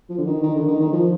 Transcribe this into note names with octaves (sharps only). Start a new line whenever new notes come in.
F3
D3
D#3
D#3
D3
D#3
D#3
F3